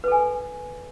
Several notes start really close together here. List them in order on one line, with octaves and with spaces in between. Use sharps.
B4 A4 G#5